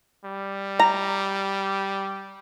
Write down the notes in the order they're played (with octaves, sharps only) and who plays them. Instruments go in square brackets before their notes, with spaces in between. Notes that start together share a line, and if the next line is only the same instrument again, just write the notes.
[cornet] G3
[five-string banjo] A#5